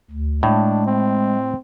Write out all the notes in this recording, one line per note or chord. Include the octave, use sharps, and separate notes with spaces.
D2
A2 G#3 D4
C4